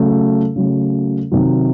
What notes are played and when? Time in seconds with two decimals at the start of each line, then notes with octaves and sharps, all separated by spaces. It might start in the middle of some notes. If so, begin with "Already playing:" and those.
Already playing: C#3 F#3 A3
0.56 C#3 F#3 A3
1.32 C3 D#3 F#3